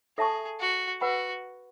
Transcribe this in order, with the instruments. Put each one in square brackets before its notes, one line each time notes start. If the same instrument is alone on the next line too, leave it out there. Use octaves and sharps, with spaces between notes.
[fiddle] G#4 [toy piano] A4 E5 A5 C#6
[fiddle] F#4
[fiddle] F#4 [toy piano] B4 F#5 B5